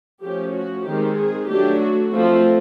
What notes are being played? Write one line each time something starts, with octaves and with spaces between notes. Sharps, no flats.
F3 A3 C#4 G4
F#4
D#3 G#3 C4 G4
G#4
F#3 A3 D4 G4
F#4
F3 A3 C4